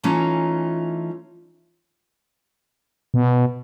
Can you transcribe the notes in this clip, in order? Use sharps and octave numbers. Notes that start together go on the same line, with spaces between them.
E3 A3 C#4 D#4 F4 A#5
B2